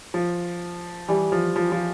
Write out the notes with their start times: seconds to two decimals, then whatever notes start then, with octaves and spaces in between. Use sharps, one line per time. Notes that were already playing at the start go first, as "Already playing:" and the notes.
0.14 F3
1.08 E3 G3
1.32 F3
1.56 F3
1.72 F3